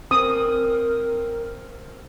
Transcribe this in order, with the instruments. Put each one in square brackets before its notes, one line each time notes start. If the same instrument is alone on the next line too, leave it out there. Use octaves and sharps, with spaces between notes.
[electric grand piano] C4 [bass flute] A#4 [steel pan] D#6